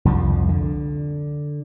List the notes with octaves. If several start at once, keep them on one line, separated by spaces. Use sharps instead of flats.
C2 F2 F3
D3